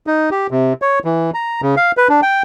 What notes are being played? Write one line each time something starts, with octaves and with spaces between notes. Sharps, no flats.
D#4
G4
C3
C#5
E3
A#5
C#3
F5
B4
D4
G5